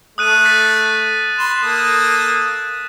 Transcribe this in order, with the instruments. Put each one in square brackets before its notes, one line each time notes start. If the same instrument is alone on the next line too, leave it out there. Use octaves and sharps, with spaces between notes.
[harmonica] A3 [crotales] D#6 F#6 D#7
[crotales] A6 B6
[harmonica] B5 C6 [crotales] E7
[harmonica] A#3 A4 D#6